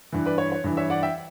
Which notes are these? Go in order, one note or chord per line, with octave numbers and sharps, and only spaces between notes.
G2 E3
B4 D5
C#5
C#5
G2 E3
C#5 E5
D5 F#5
E5 G5